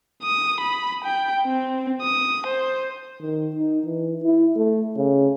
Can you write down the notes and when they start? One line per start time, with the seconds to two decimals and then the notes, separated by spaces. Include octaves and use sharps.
0.23 D#6
0.60 B5
1.04 G5
1.45 C4
2.02 D#6
2.47 C5
3.21 D#3
3.56 D#4
3.86 E3
4.24 E4
4.56 A3
4.97 C#3